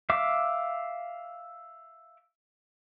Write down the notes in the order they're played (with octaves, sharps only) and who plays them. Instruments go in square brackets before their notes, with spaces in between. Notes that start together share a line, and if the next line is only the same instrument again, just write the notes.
[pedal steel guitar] E5 F5 D6